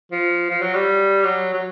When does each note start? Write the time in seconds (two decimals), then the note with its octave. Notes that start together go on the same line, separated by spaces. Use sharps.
0.12 F3
0.50 F3
0.62 F#3
0.74 G3
1.24 F#3
1.54 F#3